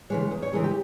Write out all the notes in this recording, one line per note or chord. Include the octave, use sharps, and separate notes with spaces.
C#3 E3 G#3 C#5
E2
C#5
C#3 E3 G#3 A#4
G4